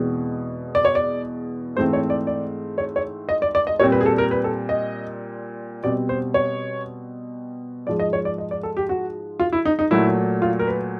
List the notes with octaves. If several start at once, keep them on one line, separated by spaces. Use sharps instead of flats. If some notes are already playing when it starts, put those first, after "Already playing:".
Already playing: E2 B2 G#3 C4
D5
C#5
D5
G#2 E3 A3 C4 C5
C#5
D5
D5
C#5
C#5
D#5
D5
D5
D#5
A#2 G3 C4 C#5
B4
G#4
A4
A#4
B4
A4
D#5
B2 G3 C4 D5
C5
C#5
G#2 F3 G#3 D5
D#5
C#5
D5
D#5
D5
A4
G4
F#4
F4
E4
D#4
D#4
A#2 F#3 A3 E4
F4
A#4
B4